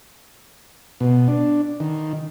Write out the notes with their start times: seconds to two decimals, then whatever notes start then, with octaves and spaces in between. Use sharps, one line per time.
1.01 B2
1.28 D4
1.80 D#3